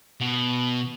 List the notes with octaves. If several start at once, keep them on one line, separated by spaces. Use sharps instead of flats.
B2